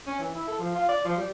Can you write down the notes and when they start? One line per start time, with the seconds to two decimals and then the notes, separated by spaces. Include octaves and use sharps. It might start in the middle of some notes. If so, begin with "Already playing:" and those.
0.07 C#4
0.19 E3
0.35 E4
0.48 A4
0.59 F3
0.75 F4
0.89 D5
1.05 F3
1.17 G3